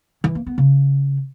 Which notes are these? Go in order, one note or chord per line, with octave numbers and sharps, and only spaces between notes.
E3
A#3
B3
C#3